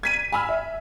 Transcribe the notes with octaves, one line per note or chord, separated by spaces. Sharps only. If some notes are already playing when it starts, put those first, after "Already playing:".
G#6 B6 D#7
G#5 B5 E6 F6
E5